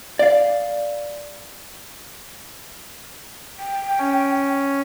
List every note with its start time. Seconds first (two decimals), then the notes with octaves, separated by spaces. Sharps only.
0.19 D5 F5
3.59 G5
3.99 C#4